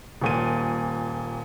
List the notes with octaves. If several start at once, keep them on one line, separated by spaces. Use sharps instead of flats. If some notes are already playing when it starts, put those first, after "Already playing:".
D#1 A#2 D#7